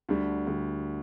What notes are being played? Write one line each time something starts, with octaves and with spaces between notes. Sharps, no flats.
D2 D3 G3
D2 D3 G3